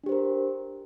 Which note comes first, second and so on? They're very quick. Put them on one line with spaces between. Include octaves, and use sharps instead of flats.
D4 G4 C5 A#4